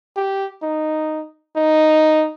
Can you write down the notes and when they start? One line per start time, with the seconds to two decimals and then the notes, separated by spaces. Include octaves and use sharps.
0.16 G4
0.62 D#4
1.56 D#4